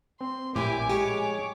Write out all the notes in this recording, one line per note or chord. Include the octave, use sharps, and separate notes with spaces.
C4 C6
A#1 A2 E4 G4 G#5 D6
G#3 G4 G#4 C#5 G#5 A#5 D6